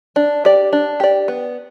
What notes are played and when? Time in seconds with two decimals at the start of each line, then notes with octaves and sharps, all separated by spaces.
0.16 D4
0.45 G4 D5
0.73 D4
1.00 G4 D5
1.28 B3